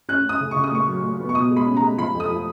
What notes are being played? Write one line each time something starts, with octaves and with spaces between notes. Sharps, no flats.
C#4 F#6
C#4 D#6
C#3
C#3 C#6
D#6
A#2 C#6
F#3
A#2
B3
C#6
B2 D#6
G#3
B5
C#4
A#5
G#3
F3 B5
F2
D#6
F3